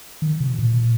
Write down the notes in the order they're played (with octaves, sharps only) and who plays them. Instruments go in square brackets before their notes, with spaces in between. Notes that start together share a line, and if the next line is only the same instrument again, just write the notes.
[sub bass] D#3
C3
B2
A#2